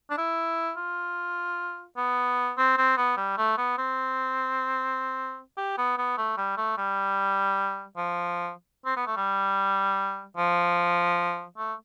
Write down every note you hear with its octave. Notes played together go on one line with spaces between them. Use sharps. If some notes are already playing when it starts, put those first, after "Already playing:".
D4
E4
F4
B3
C4
C4
B3
G3
A3
B3
C4
G4
B3
B3
A3
G3
A3
G3
F3
C4
B3
A3
G3
F3
A3